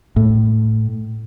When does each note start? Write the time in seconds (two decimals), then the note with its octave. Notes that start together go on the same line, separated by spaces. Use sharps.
0.16 A2